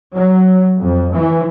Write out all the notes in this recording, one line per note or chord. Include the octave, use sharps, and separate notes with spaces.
F#3
F2
E3